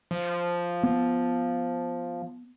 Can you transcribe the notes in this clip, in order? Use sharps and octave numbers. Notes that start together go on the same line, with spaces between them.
F3
B3